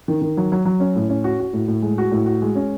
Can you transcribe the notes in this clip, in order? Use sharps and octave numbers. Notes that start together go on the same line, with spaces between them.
D#3
D#3
F#3
F#3
F#3
C#4
A2
C#4
F#4
F#4
A2
A2
G#3
F#4
A2
F#4
G#3
C#4